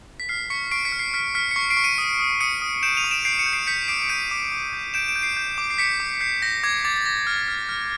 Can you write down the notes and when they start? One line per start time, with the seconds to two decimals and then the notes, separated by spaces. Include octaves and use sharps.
0.20 B6
0.29 F6 C7
0.50 C#6 B6 C#7
0.71 C#6 C7 D7
0.85 B6 C#7
0.92 F6
0.99 C7
1.14 F6 B6
1.35 F6 B6 C#7
1.51 C#7
1.56 C#6 C7
1.70 C7 D7
1.77 C#6
1.84 C#7 D#7
1.98 D#6
2.19 D#6
2.40 D#6 C#7 D#7
2.62 D#6
2.83 G6 D7 E7
2.97 D#7 F7
3.04 D#6
3.11 D7 E7
3.25 G6 C7 D7
3.39 C#7 D#7
3.46 G6
3.53 C7 D7
3.67 G6 B6 C#7
3.88 D6 C7 D7
4.02 D7
4.09 G6 C#7 D#7
4.31 D6
4.52 D6
4.73 G6
4.94 G6 D7 E7
5.08 D7 E7
5.16 G6
5.22 C7 D7
5.37 G6
5.58 D6
5.70 C7
5.78 D6 B6 C#7
6.00 D6
6.21 G6 C7
6.42 G6 A#6
6.63 D6 G#6
6.85 D6 A6
6.96 A6
7.06 D6 A#6
7.27 F6
7.48 F6
7.69 F6